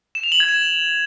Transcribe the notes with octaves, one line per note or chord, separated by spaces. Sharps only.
E7
F7
F#7
G#6
E7